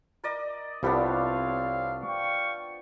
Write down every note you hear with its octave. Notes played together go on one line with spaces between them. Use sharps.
A#4 D5 D#5
C2 F3 G3 B3 C4 D4 C#5 F5
F5 G5 C#6